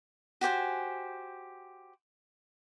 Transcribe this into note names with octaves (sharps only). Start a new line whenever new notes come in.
F#4 G4 C5 G#5